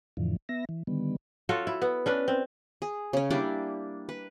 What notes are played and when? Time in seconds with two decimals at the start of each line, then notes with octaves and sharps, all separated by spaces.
0.17 F2 A2 D3 E3 F3
0.49 B3 E5 A#6
0.69 E3
0.87 D3 D#3 G3 B3
1.49 F4 F#4 A4 C#5
1.67 E4
1.82 B3
2.06 C#4 D4 B4
2.28 C4
2.82 G#4
3.13 C#3 C#4
3.30 G3 A#3 D4 E4
4.09 B4